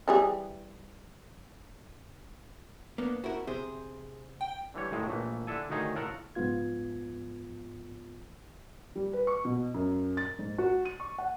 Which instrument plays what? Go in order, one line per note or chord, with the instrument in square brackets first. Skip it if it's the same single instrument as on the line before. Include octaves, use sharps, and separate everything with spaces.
[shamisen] E3 G3 G#4
[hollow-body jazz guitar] A#3 B3 [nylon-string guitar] D4
[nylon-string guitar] C4 E4 [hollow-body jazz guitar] F#4 A#4
[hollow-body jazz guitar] C3 C5 [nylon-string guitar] G#4
[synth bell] G5
[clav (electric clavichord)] D3 E3 G3 C#5
F2 A2 D#3 G#3
A#1 E3 A3 A#3
D3 D4 E4 A4 G#5
D2 D#3 D#4 G#4 C#5 G#5
A2 F4 F#4 A4 A#4 F#5
[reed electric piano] C#2 G#2 F3 B3 F4 G#6
[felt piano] G3
B4
C#6
B2
F#2
A6
G#2
F#4
D#7
C#6
F#5